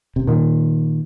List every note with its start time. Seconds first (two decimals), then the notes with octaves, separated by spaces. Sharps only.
0.16 C3
0.27 A#2 D#3